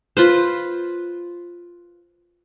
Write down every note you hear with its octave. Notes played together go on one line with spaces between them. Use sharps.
F4 B4 C5